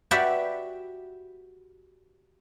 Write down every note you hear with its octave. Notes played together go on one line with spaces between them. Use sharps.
F#4 G4 B4 D5 E5